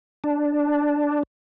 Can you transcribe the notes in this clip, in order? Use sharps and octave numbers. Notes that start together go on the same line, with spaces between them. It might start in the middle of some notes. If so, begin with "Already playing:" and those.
D4